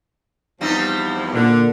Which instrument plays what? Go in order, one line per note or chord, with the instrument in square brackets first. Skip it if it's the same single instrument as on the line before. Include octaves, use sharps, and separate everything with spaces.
[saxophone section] E2 F3 [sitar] G3 C4 D#4
[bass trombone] A#2 [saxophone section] D3